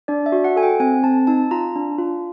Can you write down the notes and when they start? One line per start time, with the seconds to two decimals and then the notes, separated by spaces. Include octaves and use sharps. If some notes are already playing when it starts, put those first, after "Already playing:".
0.08 D4 D5
0.26 E5
0.32 F#4
0.44 F#5
0.56 A4 G#5
0.63 G5
0.80 C4 G#5
1.03 C4 A5
1.27 D#4 A5
1.51 F4 A#5
1.76 D4
1.98 F4